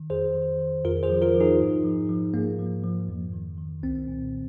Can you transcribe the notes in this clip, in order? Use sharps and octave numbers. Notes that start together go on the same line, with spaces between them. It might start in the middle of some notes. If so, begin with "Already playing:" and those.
Already playing: D#3
F2 G#4 C5
D#3
D#3
F2 F4 A#4
G#4 C5
F3
F4 A#4
F3
D#4 G#4
G#2
F3
F3
G#2 A#3
F3
F3
F2
D#3
D#3
C2 C4
A#2